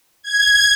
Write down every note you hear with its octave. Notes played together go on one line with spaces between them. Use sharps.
G#6